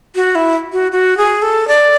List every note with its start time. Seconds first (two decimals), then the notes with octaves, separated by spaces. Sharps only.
0.15 F#4
0.35 E4
0.72 F#4
0.92 F#4
1.17 G#4
1.42 A4
1.68 D5